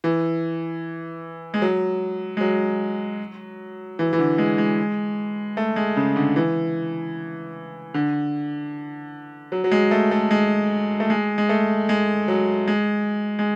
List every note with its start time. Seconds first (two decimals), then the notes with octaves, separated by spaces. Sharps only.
0.04 E3
1.54 G#3
1.62 F#3
2.37 G#3
2.41 F#3
3.99 E3
4.13 E3
4.19 D3
4.38 G#3
4.58 G#3
5.57 A3
5.76 G#3
5.97 C#3
6.16 D3
6.36 E3
7.94 D3
9.52 F#3
9.64 F#3
9.71 G#3
9.91 A3
10.11 A3
10.31 G#3
11.00 A3
11.10 G#3
11.38 G#3
11.49 A3
11.89 G#3
12.28 F#3
12.68 G#3
13.39 G#3